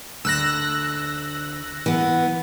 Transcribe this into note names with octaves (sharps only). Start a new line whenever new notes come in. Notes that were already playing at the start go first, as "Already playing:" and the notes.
D2 E6 F#6 A#6
E3 B3